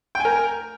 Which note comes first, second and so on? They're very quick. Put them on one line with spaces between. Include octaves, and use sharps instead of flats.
G5 G#5 A#4